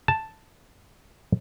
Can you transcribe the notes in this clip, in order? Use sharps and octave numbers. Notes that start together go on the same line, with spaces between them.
A5